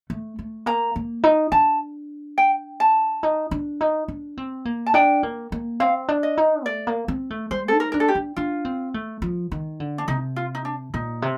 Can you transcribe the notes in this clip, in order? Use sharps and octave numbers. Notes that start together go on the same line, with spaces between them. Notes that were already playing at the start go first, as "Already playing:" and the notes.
A3
A3
A#3 A#5
A#3
D#4
D4 A5
G5
A5
D#4
D4
D#4
D4
C4
A#3
A5
D4 G5
A#3
A#3
C4 F5
D4
D#5
D#4
A3 D5
A#3
C4
A3
G3 C5
D#4 A4
A#4
D4 A#4
A4
G4
D4
D4 F4
C4
A3
F3
D#3
D3
D4
C3 D#4
F4
D#4
D4
A#2 D#4
C3